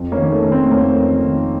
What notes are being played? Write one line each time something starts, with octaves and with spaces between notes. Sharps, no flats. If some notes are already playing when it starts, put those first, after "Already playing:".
Already playing: F2
A#3 C#4
D#3
A3
D#3 C#4
A3 C4
F2 A#3 C#4
F2
D#3